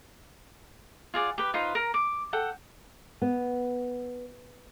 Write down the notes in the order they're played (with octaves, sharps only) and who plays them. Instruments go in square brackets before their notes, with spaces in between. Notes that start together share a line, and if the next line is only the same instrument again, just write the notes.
[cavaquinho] F4 G#4 D5 F#5
G4 B4
D#4 F4 B4 C5
A#4 A#5
D6
A4 F#5 G5
[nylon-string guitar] B3